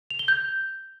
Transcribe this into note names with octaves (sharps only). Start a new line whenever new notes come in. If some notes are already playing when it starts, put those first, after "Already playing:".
F7
G7
G6